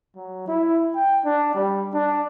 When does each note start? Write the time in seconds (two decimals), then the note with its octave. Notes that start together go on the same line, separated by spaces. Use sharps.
0.16 F#3
0.48 E4
0.96 G5
1.25 D4
1.55 G3
1.94 D4